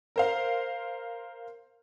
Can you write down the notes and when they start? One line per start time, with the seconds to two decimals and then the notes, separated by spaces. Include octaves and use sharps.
0.16 A#4 C5 F5